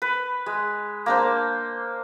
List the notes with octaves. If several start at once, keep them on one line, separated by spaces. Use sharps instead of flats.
B4
G#3
A#3 D4 C5